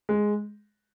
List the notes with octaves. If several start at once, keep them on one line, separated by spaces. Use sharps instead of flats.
G#3